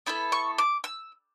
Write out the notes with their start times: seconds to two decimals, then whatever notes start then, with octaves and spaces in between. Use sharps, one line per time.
0.06 B3 E4 A4 B5
0.32 C#6
0.58 D6
0.84 E6